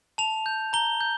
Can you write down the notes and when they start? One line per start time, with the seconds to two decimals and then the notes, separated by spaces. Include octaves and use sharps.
0.18 A5 F7
0.46 G6
0.73 A#5 G7
1.01 G6